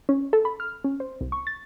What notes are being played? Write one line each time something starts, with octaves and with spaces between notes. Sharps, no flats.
C#4
A4
B5
F6
C#4
C5
C2
C#6
A6